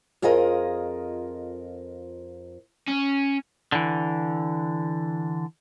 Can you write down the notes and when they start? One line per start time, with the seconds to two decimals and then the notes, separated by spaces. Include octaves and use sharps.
0.22 F2 F4 G#4 A#4 D#5
2.88 C#4
3.72 D3 E3